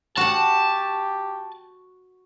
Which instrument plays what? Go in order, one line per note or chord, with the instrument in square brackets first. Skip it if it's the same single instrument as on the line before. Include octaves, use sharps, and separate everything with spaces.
[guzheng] F#4 F#5 [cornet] G4 [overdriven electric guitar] A5